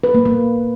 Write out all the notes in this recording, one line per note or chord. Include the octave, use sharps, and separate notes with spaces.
B4
A#3
A#3